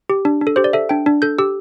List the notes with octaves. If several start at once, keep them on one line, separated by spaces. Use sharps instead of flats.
G4
D4
D4
A4
G4 C5
D5
A4 E5
D4 G5
D4
A4 G6
G4 E6